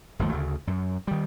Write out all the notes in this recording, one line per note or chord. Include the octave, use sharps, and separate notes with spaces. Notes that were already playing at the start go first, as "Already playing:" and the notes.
G1 D#2 F3 A3
D2 C#3
F#2
D#3 G3